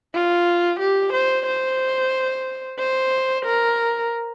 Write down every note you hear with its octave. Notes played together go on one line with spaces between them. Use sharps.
F4
G4
C5
C5
C5
A#4